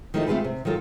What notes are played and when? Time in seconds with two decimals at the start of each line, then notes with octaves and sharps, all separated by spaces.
0.14 D#3 F3 A3 E4 A4 D#5
0.27 A3 C4 F4 G4 G#4 B4
0.44 C3
0.65 D#3 F#3 F4 A4